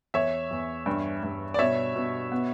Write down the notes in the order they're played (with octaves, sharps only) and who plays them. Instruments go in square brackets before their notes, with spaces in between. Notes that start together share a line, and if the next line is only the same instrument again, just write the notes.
[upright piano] E2 C#5 E5
E2
G2
G2
D5
B2 C#5 E5
B2
B3